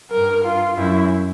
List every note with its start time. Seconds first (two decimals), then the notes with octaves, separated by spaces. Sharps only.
0.11 G2 A#4
0.44 F4
0.77 F#2 E4